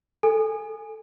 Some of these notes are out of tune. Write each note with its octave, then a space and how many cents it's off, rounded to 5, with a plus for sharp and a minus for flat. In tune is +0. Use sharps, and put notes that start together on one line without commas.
A4 +0 G#5 -5